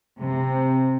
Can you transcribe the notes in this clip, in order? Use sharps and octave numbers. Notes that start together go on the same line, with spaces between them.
C3